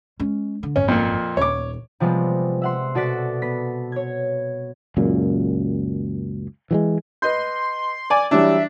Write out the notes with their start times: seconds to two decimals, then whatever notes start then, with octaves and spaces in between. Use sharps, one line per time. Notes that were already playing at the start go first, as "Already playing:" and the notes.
0.20 G#3 C#4
0.63 D3
0.76 G#1 F#2 C#4
0.88 F2 A#2
1.37 D#1 C#5 D6
2.00 C3 F3 G3 G#3 B3
2.62 E5 F#5 C6
2.95 B2 F#4 A4 D5 F#6 B6
3.42 B3 B6
3.92 C#5 G#6
4.97 C#2 F#2 A#2
6.71 E3 F#3 G#3
7.22 B4 D#5 C6 G6
8.10 D5 G#5
8.31 E3 F#3 G3 D4 E5